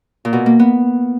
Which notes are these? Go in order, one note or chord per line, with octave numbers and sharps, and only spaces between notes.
A#2
B2
A#3
B3